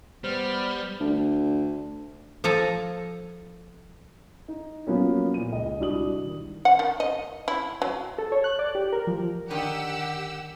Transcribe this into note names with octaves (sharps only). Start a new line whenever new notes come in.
G3 B3 C5 F6
D2
F3 A4 G#5 A#5
D#4
F3 F#3 A#3 B3 C#4 D#4
A#2 D#7
C#2 D#5
C2 D4 F#4 D#6 F#7
D#3
F#5
D#3
D#5
E4
F#3
A4
C#5
F#6
D5
G4
A#4
F3
D3 D#3 G4 F#5 E6